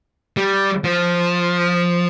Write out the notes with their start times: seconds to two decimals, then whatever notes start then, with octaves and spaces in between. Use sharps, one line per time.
0.37 G3
0.84 F3